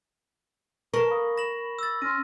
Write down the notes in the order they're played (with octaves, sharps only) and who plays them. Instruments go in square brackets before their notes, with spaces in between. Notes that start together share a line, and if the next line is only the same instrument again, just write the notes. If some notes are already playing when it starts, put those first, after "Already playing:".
[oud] A#4 [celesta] B4 E7 [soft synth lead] A5 [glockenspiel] C#6 A#6
[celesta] F5 D#6 [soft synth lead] B5
[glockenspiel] A#6 F#7 [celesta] E7
[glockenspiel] E6 A6
[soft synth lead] C#4 [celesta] C6 F6 A#6 [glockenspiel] D#7